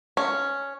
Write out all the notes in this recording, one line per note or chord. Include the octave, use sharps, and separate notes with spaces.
C#4